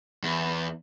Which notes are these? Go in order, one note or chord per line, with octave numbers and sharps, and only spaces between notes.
E2